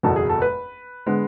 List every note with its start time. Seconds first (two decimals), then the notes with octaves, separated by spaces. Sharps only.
0.03 F#1 E2 B2 A4
0.16 G#4
0.29 A4
0.42 B4
1.07 D3 G#3 B3